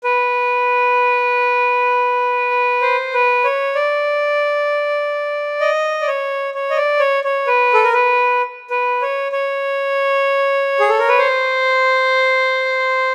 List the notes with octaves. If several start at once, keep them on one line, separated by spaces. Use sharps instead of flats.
B4
C5
B4
C#5
D5
D#5
D5
C#5
C#5
D#5
D5
C#5
C#5
B4
A4
A#4
B4
B4
C#5
C#5
G#4
A4
A#4
B4
C5